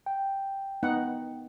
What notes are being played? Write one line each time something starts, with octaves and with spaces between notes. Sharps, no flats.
G5
B3 D#4 F#5